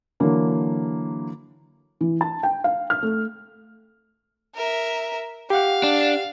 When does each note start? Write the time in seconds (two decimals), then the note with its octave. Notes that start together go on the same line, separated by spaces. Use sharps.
0.20 D3 E3 F#3 A#3
2.01 E3
2.21 A5
2.43 G5
2.64 F5
2.90 F6
3.03 A3
4.55 A#4 E5
5.50 G4 F5 F#5
5.83 D4